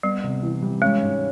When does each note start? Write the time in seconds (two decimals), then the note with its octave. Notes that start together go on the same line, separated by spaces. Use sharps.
0.03 G3 B3
0.24 C3
0.43 E3
0.62 G3
0.82 G#3 C#4
1.02 G#2